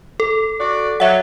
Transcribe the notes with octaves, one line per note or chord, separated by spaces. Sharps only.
A4
F#4 D5
F#3 E5 F#5